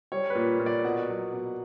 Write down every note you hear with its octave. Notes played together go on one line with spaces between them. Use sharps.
G3 C#5
B4
A#2
A#2
D5
B2 F#5
F#3
B2